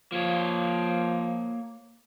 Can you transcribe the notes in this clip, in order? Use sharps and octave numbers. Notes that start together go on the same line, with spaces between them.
F3 A#3 C#5